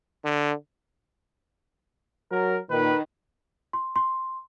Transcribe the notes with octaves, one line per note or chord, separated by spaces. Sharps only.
D3
F#3 A#4
A#2 D#3 B4
C6
C6